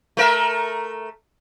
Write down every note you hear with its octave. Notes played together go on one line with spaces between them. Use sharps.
A3 A#4 E5